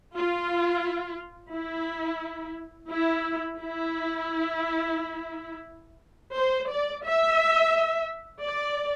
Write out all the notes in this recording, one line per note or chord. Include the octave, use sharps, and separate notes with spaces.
F4
E4
E4
E4
C5
D5
E5
D5